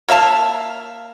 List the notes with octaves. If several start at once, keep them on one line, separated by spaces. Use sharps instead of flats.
A#3 E5 F5 A5